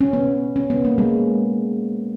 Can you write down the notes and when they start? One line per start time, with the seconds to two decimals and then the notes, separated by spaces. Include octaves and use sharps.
0.01 C#4
0.13 B3
0.56 C#4
0.70 B3
0.85 A#3
0.98 G#3